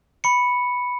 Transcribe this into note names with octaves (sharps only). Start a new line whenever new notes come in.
B5 C#7